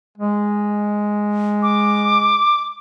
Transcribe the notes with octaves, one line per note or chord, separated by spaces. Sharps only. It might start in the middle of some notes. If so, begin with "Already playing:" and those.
G#3
D6